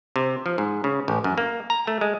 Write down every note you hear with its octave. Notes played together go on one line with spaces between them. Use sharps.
C3
F3
G#2
C#3
A1
F#2
A#3
A#5
A3
G#3